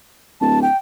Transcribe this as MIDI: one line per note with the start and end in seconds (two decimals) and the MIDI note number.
0.41 0.67 26
0.41 0.62 81
0.62 0.77 79